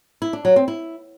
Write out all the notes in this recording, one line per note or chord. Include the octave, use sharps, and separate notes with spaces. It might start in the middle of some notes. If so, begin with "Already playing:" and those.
E4
D4
F#3
C4
E4